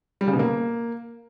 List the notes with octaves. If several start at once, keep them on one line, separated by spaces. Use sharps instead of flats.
G3
C#3
B2
A#3